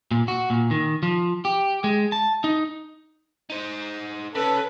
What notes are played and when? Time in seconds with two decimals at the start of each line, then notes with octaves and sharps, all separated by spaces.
0.11 A#2
0.28 F#4
0.50 A#2
0.71 D#3
1.03 F3
1.45 G4
1.84 G#3
2.12 A5
2.44 D#4
3.50 D#4 C5
4.35 C#3 C#4 A4 B4